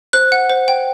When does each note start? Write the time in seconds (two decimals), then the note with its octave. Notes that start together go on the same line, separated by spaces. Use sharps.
0.13 C5 F#6
0.32 F#5
0.50 C5
0.68 G5